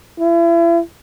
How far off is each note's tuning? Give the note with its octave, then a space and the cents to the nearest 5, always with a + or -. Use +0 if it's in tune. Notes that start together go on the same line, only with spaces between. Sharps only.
E4 +40